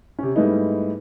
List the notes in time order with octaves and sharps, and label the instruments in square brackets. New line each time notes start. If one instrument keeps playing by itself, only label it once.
[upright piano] C3 C#4
G#2 G3 A3 B3 D#4 E4